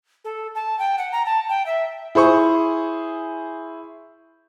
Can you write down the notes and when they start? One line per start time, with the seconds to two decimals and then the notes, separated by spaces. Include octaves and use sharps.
0.25 A4
0.55 A5
0.79 G5
0.98 F#5
1.12 A#5
1.26 A5
1.49 G5
1.66 E5
2.15 E4 G#4 C5 C#6